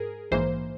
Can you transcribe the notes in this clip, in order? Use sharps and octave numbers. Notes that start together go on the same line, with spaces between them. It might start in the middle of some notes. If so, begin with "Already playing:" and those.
Already playing: G#2 G#4 A#4
A#1 G#2 E3 A#3 C5